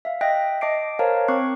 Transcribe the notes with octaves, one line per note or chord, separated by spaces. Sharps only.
E5 F5
D#5 E5 G5 F#6 A#6
D#5 A5 D6 C7 D7
A#4 C5 C#5 F5 A5 A#5
C4 C#6 D6 F#6 C7